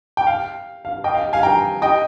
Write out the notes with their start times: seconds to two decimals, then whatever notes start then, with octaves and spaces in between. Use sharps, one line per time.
0.17 G5
0.27 F5
0.85 F5
1.04 D#5 G5
1.15 F5
1.33 F5 G#5
1.43 G5 A#5
1.82 D#5 G5